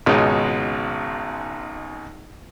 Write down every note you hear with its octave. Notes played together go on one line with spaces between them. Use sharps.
G#1 C#2 B2 G#3 D#4 C#5